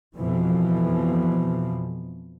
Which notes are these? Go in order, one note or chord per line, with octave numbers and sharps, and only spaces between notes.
F2 B2 E3 F3